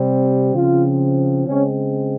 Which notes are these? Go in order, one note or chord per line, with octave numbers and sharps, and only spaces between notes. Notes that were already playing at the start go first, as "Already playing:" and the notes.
Already playing: C3 G3 C4
C#3 F3 C4 F4
C#3 G#3 C4 C#4